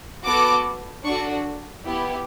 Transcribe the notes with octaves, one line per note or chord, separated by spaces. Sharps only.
B3 F#4 A4 D6
D4 F#4 A4 C#6
B3 E4 G4